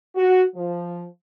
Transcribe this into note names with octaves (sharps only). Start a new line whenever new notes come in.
F#4
F3